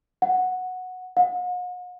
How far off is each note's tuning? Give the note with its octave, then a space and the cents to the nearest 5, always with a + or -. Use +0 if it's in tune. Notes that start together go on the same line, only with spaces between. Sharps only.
F#5 -5
F#5 -45